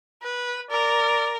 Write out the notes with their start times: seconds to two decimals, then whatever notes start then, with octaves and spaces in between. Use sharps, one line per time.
0.22 B4
0.70 A#4 D5